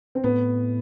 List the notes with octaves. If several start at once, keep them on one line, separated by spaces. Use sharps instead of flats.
C4
A2 B3